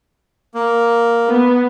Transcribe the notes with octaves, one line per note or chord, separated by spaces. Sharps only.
A#3
B3